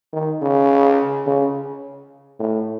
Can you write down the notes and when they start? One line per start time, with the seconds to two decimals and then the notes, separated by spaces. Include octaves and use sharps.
0.13 D#3
0.42 C#3
1.26 C#3
2.39 A2